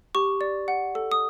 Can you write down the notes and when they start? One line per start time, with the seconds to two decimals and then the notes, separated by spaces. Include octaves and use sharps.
0.15 G4 C#6
0.41 D5
0.68 F#5
0.95 A4
1.12 D#6